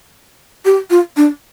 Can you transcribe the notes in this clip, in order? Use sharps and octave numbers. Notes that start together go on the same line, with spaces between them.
G4
F4
D4